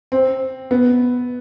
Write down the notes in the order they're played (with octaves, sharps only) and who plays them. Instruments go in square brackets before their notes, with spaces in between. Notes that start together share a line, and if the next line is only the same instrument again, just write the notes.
[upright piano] C4
B3